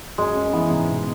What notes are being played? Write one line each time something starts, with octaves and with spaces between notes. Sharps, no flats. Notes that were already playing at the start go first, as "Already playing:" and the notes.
F#2 G#3
C#4
E3 B3
G#2
B2